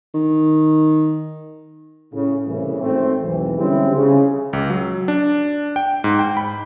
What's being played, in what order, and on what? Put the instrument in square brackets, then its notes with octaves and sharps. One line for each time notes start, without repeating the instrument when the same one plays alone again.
[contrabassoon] D#3
[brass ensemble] A2 C#3
C2 A2 C#3 E3
G#1 A3 C4
B1 E2 G#2 E3
D3 G3 G#3 C4 C#4 E4
C#3
[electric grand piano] C#2
F#3
D4
G5
G#2
G5
B5